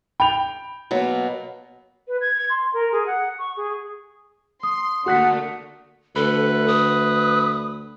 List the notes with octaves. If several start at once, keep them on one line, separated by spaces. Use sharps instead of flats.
G5 B5 F7
B2 F#3 A#3
B4
G#6
G#6
C6
A#4
G#4
F#5
C#6
G#4
C6 D#6
D3 A3 A#3 F#4 F#5 F#6 B6
D2 A4 B4
D#6